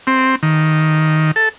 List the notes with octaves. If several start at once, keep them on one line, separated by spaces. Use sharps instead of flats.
C4
D#3
A4